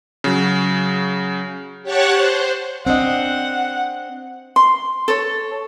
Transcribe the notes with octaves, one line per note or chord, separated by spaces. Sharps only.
C#3 F#3
G4 C#5 F#5 A5 C#6 F#6
C5
C4 D4 D#5 F#5
C6
A4 C#5